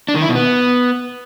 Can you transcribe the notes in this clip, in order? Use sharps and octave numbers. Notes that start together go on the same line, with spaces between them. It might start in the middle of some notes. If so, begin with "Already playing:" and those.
D4
D#3
E4
B2
B3